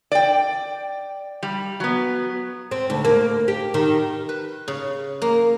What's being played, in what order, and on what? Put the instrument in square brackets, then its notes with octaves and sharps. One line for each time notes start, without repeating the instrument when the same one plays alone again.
[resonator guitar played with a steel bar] D5 G5
G3
F#3 B3
[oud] C4
D2
A#3
G4
D#3
[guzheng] B4
C#3
A#3